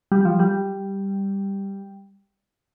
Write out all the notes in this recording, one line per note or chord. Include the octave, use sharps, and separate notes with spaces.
G3
F3
G3